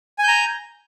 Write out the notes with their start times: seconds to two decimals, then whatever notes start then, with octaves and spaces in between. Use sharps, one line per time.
0.19 G#5
0.23 G6
0.28 A#5